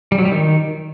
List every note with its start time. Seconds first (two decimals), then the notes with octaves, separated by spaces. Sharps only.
0.12 G3
0.18 F#3
0.25 G3
0.32 D#3